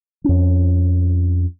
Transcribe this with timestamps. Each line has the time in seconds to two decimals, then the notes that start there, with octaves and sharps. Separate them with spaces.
0.24 F2 C#4